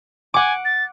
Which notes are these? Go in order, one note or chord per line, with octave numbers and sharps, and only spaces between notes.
F#5 G#5 D6
A6